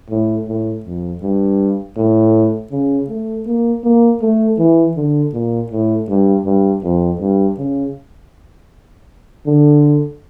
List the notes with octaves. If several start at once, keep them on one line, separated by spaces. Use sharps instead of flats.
A2
A2
F2
G2
A2
C#3
A3
A#3
A#3
A3
E3
D3
A#2
A2
G2
G2
F2
G2
C#3
D3